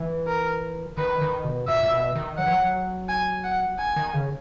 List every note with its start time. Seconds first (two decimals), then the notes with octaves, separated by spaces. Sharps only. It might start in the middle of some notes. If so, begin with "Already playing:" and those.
Already playing: E3
0.27 A#4
0.98 D#3 B4
1.21 D#3
1.44 B2
1.68 A#2 E5
1.83 A#2
1.91 B2
2.15 D#3
2.38 F#3 F#5
2.46 E3
2.53 F#3
3.09 G#5
3.44 F#5
3.79 G#5
3.96 D#3
4.14 C#3